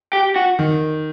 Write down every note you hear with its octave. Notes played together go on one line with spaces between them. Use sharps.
G4
F#4
D#3